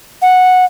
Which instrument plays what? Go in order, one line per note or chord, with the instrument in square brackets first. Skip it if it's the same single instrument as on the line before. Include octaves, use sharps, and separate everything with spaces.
[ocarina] F#5